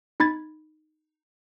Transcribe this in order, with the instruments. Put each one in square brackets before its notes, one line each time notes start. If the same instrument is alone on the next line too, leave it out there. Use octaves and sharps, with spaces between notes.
[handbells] D#4 B5 G#6 A6